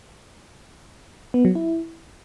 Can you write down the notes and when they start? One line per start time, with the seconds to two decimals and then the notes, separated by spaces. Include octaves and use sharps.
1.34 B3
1.45 F#3
1.55 E4